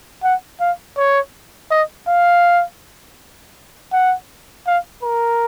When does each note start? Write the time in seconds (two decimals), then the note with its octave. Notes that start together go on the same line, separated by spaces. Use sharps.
0.24 F#5
0.60 F5
0.97 C#5
1.71 D#5
2.08 F5
3.93 F#5
4.67 F5
5.03 A#4